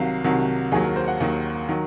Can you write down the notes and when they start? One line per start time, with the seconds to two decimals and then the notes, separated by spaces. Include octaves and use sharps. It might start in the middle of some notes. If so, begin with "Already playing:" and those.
Already playing: C2 C3 D#3 F#3 F5
0.24 C2 C3 D#3 F#3
0.72 D#2 D#3 F#3 G#4
0.84 A#4
0.96 C5
1.08 F#5
1.20 D#2 D#3 F#3
1.69 D#3 F#3